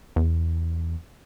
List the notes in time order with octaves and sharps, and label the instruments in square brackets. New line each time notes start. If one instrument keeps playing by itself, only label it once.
[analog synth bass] E2